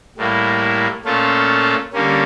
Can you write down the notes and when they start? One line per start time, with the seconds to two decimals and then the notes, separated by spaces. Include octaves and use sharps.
0.17 A2 G3 A#3 E4
1.05 A#2 A3 C#4 F4 A4
1.93 D3 G3 A#3 C#4